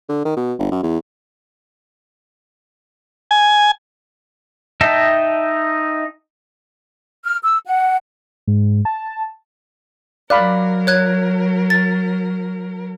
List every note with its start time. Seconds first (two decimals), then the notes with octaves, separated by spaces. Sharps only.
0.09 D3
0.25 D#3
0.37 B2
0.59 G1
0.72 F#2
0.83 E2
3.31 G#5
4.81 D#4 D#5 E5 G5 A5
7.24 F6
7.44 E6
7.66 F#5
8.47 G#2
8.85 A5
10.30 F#3 A#4 D5 F5 B5 F#6
10.87 C#5 F#6 G#6
11.70 A6